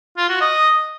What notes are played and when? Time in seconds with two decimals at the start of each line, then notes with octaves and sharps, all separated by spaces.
0.17 F4
0.29 F#4
0.41 D#5